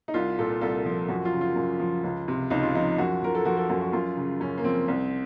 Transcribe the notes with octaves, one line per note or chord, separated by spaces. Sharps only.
D#4
C2 F4
A#2 A4
C2 A4
F3
F#2 F#4
F4
C#3
F4
F#2
F3
C#2
C3
C#2 D#4
F4
F3 D#4
F#2 F#4
F3 A#4
A4
F3 F#4
A4
F#2 F#4
F#4
F#2 F4
C#3
F#2 C#4
A#3
F3 C4
C2